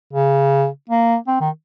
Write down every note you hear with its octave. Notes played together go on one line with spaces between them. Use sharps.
C#3
A#3
C4
D#3